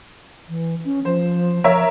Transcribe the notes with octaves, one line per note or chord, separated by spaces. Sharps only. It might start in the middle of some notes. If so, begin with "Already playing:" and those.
E3
C#4
F3 C5
F3 A#4 C#5 E5